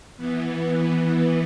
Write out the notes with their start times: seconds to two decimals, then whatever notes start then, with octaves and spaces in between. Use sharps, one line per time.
0.17 E3 B3